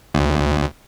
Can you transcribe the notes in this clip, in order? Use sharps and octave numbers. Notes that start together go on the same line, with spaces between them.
D2